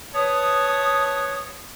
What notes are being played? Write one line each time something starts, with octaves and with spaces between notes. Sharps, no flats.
B4 C#5 A5 D#6